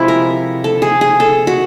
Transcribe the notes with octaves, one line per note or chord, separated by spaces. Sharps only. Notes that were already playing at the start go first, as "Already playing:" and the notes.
Already playing: C3 F3 G#3 E4
A#4
A4
G#4
G#4
A4
F#4